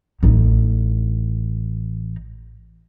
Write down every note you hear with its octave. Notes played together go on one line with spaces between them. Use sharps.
A1 D#4